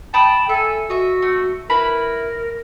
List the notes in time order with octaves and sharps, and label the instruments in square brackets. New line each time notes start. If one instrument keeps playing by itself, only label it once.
[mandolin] G5 B5 D#6 [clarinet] A5
[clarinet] A4 [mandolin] E5 G#5
[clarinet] F#4 [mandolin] D#5 E5
[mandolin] A3
[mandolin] E4 B4 B5 [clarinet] A#4